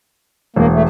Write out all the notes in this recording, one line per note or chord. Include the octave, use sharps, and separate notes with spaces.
E1 A#3
A3